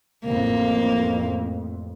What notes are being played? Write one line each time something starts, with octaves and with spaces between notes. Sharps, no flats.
A1 F2 A2 A#3